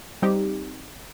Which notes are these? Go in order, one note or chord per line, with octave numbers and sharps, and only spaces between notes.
G3 C4 D#4 G4